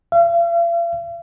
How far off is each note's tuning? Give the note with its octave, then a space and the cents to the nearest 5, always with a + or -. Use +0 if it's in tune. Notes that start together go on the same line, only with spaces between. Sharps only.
F5 -45